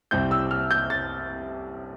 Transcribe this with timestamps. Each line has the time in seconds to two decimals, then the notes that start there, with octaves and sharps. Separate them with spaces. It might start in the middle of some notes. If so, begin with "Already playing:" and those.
0.11 C2 C3 G3 C4 E4 G6
0.31 E6
0.51 F6
0.71 G6
0.90 A6